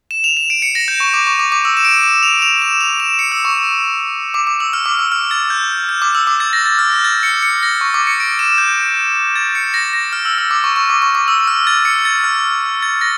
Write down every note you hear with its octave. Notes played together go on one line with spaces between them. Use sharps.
E7
F7
E7
D7
C#7
A#6
G6
C#6
D6
C#6
D6
D6
E6
E7
D7
E7
F7
F7
E7
F7
E7
C#7
E6
C#6
D6
D6
E6
F6
D6
E6
F6
A6
G6
G6
D6
E6
D6
A6
A#6
A6
F6
G6
A6
C#7
C#7
A#6
C#6
D6
C#7
D7
E7
G6
A6
C#7
A#6
A#6
F6
E6
E6
D6
C#6
C#6
D6
C#6
D6
E6
F6
A6
C#7
A6
F6
A6
A#6